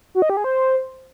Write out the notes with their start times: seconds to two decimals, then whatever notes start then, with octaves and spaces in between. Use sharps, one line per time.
0.15 F#4
0.22 D#5
0.30 G4
0.37 G#4
0.44 C5